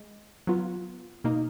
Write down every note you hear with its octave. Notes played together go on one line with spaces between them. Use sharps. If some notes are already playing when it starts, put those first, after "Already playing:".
Already playing: G#3
F#3 B3 F4
B2 A#3 D#4